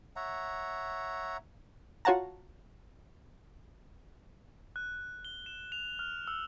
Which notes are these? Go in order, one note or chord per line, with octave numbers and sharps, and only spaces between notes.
C#5 E5 F#5 A#5
F4 F#4 C#5 F#5 A5 A#5
F#6
G7
E7
F7
F6
E6